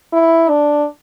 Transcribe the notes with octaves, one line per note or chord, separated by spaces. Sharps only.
E4
D4